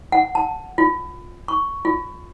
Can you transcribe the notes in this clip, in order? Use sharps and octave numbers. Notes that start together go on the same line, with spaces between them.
F#5
A5
F4
C#6
F4